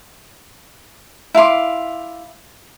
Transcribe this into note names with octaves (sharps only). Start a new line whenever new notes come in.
E4 F5 C6 D6